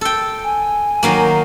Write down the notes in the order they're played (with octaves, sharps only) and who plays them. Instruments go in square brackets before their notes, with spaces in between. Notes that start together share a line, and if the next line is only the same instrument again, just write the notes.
[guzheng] A4 G5
[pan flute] G#5
[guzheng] D#3 F#3 A#3